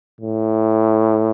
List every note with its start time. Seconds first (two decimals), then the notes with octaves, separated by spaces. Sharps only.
0.21 A2